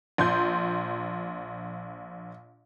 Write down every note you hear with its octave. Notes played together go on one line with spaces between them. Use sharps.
A#1 C6 G6